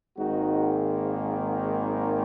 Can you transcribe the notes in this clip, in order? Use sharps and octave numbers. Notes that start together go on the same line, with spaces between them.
G#1 G#2 D#3 A#3 D#4 F#4